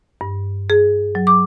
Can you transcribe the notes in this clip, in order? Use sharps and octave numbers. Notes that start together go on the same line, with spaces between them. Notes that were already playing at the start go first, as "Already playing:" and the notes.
G2
G#4
F#3
D6